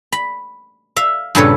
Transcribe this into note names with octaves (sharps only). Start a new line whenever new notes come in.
B5
E5 F5
G2 A#2 C#3 A4 B4 C#5